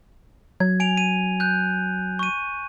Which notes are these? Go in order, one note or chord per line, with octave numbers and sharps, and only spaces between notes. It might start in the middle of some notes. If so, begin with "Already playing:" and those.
F#3 G#6
G#5 D7 F7
D#7
F#6 G6
C#6 D#7